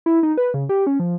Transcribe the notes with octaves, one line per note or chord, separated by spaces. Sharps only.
E4
D#4
B4
C#3
G4
C#4
F3